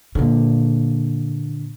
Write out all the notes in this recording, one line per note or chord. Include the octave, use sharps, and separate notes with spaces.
A#2 D3